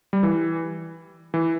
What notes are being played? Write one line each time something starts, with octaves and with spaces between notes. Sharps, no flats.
G3
E3
E3